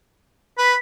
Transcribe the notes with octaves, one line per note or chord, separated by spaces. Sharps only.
B4 B6